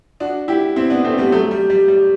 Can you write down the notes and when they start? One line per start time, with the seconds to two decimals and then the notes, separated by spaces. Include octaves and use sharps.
0.20 D4 F#4
0.48 E4 G4
0.76 C4 E4
0.90 B3 D4
1.05 A3 C4
1.18 G3 B3
1.32 F#3 A3
1.51 G3
1.70 G3
1.88 G3